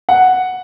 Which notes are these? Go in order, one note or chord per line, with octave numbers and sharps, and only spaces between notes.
F#5